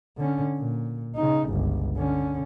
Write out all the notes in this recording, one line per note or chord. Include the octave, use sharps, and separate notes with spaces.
D3 C#4
A#2
C#3 D#4
G1 C#2
D3 C#4